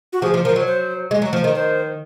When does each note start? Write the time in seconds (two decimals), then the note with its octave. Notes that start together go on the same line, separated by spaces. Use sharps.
0.13 F#4
0.22 F3 G#4
0.34 F3
0.44 F3 A#4
0.56 F#3
0.67 C5
1.11 G#3
1.22 F#3
1.33 F3
1.44 D#3
1.55 C5